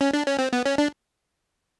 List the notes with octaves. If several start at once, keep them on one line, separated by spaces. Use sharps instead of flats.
C#4
D4
C#4
C4
B3
C#4
D4